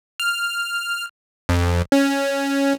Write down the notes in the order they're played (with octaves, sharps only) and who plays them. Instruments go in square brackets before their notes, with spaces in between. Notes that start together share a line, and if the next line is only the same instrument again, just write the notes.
[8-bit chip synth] F6
F2
C#4